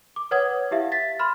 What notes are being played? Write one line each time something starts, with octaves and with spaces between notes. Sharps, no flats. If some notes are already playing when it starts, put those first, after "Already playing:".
D6
B4 C#5 F#5 D#6 G#6
E4 G4 E5 F5
A6 B6
B5 C6 F6